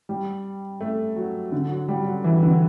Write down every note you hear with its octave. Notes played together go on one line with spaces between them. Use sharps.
G3
A3
F#3
D3
F#3
G3
F#3
E3
D3